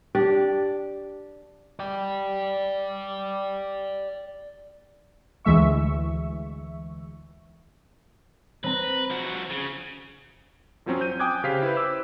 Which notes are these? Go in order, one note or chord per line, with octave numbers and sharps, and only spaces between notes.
D4 G4 D5
D5 G5
D2 E3 G#3 E5 C#6
C4 B4 A#5
F3 F#4
C#3
F#2 F3 F#3 C4 C#4
G6 D#7
G5 G#5 D6 D#6 F#6 G#6
C#3 G4 C5 F5 G6 B6
E4 B4
C5 D6 E6